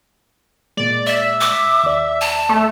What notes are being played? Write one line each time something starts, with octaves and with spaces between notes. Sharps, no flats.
A#2 G#3 D5
D5 E5
D6
D#2 D5
A5
A3